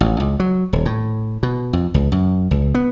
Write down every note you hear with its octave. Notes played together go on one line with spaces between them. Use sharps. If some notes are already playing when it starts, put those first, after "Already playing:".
A1
C#2
F#3
D#1
A2
B2
F2
C#2
F#2
C#2
B3